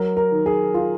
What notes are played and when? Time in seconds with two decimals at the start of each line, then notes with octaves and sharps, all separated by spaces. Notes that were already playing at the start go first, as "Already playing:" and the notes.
Already playing: F#3 A#4
0.17 A#4
0.31 D#3
0.46 G#4
0.74 F4